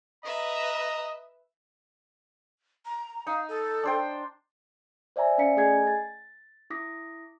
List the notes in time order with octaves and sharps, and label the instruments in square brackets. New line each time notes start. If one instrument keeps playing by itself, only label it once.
[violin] B4 E5 [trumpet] D#5 [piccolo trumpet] A#5
[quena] A#5
[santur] D#4 [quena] F5
[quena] A4
[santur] D4 C5 G5
[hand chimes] C5 D5 E5 G#5 A#5
C#4 D5 F5 A#5 B6 C#7
A3 G#4 D#5 G#5 G#6 C7
A6
E4 D6 D#6 A#6 B6